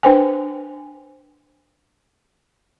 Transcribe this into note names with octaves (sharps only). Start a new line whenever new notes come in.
D4 B4 C5 G5 G#5